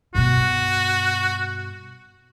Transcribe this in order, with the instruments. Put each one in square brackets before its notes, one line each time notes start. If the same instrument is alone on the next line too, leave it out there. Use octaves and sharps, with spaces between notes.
[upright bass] G2 B2 [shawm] F#4